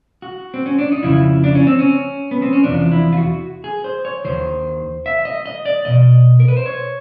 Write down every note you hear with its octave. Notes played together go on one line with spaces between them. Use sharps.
F#4
C4
C#4
D4
D#4
F2 C#3 F3 E4
D4
C#4
C4
C#4
B3
C4
C#4
E2 C3 F3 D4
E4
F4
F#4
G#4
C5
C#5
D#2 D#3 C5
E5
D#5
D#5
D5
C2 B2 D#5
A#4
B4
C5
C#5